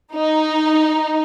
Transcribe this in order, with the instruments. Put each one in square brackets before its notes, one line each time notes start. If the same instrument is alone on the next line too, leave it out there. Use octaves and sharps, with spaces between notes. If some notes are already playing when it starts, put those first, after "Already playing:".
[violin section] D#4